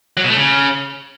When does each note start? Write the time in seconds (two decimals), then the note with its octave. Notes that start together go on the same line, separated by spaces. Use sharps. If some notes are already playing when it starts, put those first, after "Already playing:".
0.17 F#3
0.24 B2
0.30 A3
0.37 C#3